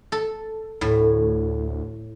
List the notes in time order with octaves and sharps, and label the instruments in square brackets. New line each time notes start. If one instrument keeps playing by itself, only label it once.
[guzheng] A4
[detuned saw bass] D2 [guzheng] A2